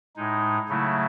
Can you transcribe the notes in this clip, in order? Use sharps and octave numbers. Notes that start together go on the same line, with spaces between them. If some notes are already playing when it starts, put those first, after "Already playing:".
A2 G#3 D#4
C#3 F#3 A3 E4